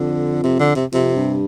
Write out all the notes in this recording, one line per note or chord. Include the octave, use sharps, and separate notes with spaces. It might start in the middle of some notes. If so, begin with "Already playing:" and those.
Already playing: F2 D3
C3
D3
C3
F2 C3
G2